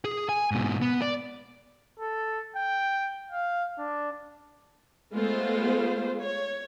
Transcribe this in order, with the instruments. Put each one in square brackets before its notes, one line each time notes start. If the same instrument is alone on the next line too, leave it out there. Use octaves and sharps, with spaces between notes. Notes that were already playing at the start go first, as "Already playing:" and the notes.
[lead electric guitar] G#4
G#5
G#2 B2
B3
D5
[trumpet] A4
G5
F5
D4
[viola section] G#3 A3 B3 F4 C5
C#5